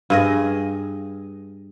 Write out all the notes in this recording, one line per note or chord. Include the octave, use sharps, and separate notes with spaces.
G2 G#4 D#5